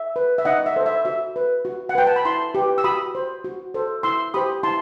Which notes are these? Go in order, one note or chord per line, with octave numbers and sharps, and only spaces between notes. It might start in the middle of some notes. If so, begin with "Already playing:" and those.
Already playing: E5
B4
E5
D#4 D#5 F#5
E5
A4 C5
E5
F#4 E5
B4
F#4
F#5
B4 G5
A5
B5
E4 A5 C6
G4 B4
E6
F#4 B5 D#6
C5
F#4
A4 C5
E4 C6 E6
G4 C5 B5 D#6
E4 A5 C6